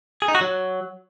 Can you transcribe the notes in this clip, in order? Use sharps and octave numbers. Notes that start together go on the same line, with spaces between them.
G#4
D#4
F#4
F#3